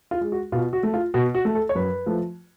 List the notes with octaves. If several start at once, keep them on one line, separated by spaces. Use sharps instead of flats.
F4
G#3
F#4
B2 F4
F#4
A3
F4
B2 F#4
F#4
A3
A4
C#5
F#2 B4
F3 A3